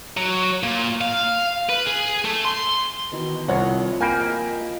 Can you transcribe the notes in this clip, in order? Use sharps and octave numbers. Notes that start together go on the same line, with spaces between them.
F#3
A#2
F5
B4
G#4
A3
C6
B2 D#3 E3
C2 F3 C4 E4 C#5 F#5
A#3 G5 G#5 B5
F3 A#4 D#5